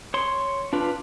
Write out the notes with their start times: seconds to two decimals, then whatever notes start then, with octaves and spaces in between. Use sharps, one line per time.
0.14 C#5 C6
0.73 D4 F4 B4